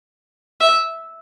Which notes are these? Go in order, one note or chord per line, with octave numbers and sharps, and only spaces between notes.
E5